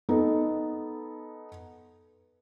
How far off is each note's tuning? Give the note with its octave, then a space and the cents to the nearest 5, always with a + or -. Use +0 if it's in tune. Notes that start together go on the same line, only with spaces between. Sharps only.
B3 -5 D#4 +0 A4 -15